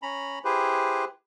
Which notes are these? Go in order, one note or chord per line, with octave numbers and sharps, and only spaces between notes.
C#4 A#5 B5
E4 G4 G#4 B4 C5